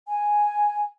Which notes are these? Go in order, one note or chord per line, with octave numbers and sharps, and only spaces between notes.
G#5